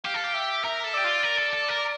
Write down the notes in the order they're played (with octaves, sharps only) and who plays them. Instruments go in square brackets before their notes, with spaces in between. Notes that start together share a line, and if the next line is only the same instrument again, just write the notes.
[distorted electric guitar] G4 [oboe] F5
[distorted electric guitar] A4
G4
[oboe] E5
[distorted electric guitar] A#4 [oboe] E5
[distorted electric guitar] A4
[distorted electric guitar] G4 [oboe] D5
[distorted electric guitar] F4
A#4
A4
A4
A#4